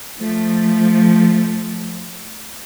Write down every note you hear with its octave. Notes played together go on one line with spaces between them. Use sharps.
F3 A3